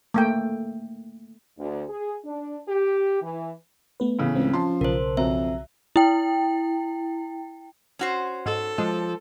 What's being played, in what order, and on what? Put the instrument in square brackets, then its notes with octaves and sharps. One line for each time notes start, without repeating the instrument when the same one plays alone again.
[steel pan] A3 A#3 G5
[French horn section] D2
G#4
D4
G4
E3
[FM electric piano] A3 B3 B4
[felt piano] A2 C#3 E3
[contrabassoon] C#2 [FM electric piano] C4
[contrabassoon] F3 [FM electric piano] C#4 [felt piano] A5 C6
[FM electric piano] B1 C#3 [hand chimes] A#4 C5
[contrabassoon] F2 [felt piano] F#3 [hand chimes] E5
[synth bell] E4 G5
[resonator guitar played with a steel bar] C#4 F#4 C5
[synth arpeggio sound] G#2 [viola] A4
[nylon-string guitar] F3 [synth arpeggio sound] G#3